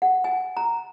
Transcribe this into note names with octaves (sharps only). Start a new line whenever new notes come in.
F#5
G#5
A#5